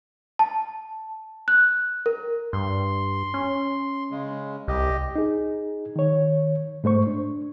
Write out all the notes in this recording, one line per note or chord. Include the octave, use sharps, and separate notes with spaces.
A5
F#6
A#4
G2 C6
C#4
C#3 G#3
C2 G4 D#5
D#4 G#4
D#3 C#5
G#2 A3 C5 C#6
D4